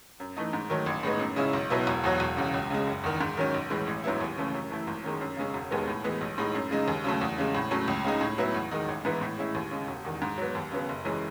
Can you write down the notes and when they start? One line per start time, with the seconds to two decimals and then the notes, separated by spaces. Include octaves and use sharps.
0.20 F#2
0.37 E3 A3 D#4
0.53 G#2
0.70 D#3 F#3 A3
0.86 A1
1.03 A2 G#3 B3 D#4
1.20 F#2
1.36 C#3 G#3 C#4 E4
1.53 B1
1.70 B2 F#3 B3 E4
1.87 E1
2.04 E2 B2 F#3
2.20 E1
2.37 E2 C#3
2.54 C#2
2.70 C#3 G#3
2.87 F#1
3.04 E2 D#3
3.21 G#2
3.37 D#3 F#3 C#4
3.54 B1
3.70 A2 E3 G#3
3.87 A1
4.04 G#2 F#3 B3 E4
4.21 D#2
4.37 C#3 E3 A3 C#4
4.54 F#2
4.70 E3 A3 E4
4.87 G#1
5.04 F#2 D#3 G#3
5.21 F#2
5.37 C#3 G#3 C#4
5.54 E1
5.71 D#2 D#3 G#3 B3
5.88 A2
6.04 E3 G#3 B3
6.21 B1
6.38 A2 G#3 D#4
6.55 F#2
6.71 C#3 G#3 D#4
6.88 D#2
7.04 C#3 F#3 A3
7.21 E2
7.38 C#3 G#3
7.55 A2
7.71 F#3 A3 C#4
7.88 C#2
8.04 C#3 G#3 D#4
8.21 A2
8.38 F#3 B3 E4
8.54 E2
8.71 D#3 G#3 D#4
8.88 A1
9.05 G#2 E3 B3 E4
9.21 A2
9.38 G#3 C#4 E4
9.55 D#2
9.71 C#3 G#3
9.88 E1
10.05 E2 D#3
10.22 G#2
10.38 F#3 B3
10.55 D#2
10.72 C#3 F#3 B3
10.89 F#1
11.05 F#2 E3 G#3 C#4